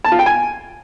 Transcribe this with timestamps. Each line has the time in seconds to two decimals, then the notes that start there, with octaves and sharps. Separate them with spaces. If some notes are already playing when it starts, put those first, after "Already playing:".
0.05 A5
0.12 F4
0.19 G5
0.26 G#5